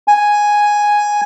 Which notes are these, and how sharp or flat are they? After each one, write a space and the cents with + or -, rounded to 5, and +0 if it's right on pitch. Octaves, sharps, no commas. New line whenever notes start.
G#5 +0